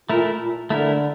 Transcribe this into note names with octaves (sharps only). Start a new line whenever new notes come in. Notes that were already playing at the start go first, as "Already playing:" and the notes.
A#2 A3 E4 A#4
A#2
D3 A3 E4 A#4